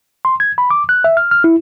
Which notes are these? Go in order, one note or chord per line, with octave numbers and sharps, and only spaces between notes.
C6
G#6
B5
D6
F#6
E5
F6
F6
E4